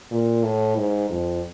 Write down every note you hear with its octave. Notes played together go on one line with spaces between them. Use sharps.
A#2
A2
G#2
F2